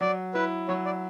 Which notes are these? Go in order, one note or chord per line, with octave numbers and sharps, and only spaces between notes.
F#3 D5
E4 B4
F#3 C#5
D5